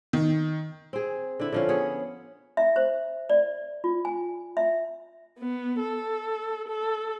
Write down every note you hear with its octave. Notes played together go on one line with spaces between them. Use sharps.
D#3
C4 G#4
D3 E4
D3 F3 C#4
B3 G#4 C#5
E5
C5
D5
F4
G#5
E5
B3
A4
A4